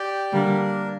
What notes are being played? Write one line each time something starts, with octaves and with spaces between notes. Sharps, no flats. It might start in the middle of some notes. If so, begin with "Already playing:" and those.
Already playing: G4 D5 G5
D3 G3 A#3 D4 A#4